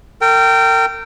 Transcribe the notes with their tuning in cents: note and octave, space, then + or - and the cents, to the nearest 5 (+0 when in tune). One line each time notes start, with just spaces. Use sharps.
A#4 -35 G5 -15